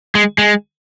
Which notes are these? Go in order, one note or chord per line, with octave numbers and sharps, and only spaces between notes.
G#3
G#3